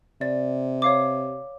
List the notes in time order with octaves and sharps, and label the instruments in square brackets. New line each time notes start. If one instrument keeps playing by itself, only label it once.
[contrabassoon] C3 [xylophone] D5
[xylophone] C#5 F5 D6